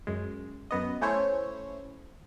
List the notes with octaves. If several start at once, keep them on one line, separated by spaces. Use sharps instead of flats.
F#2 G#3
F#2 B3 D#5
A3 C#4 E4 C5 C#5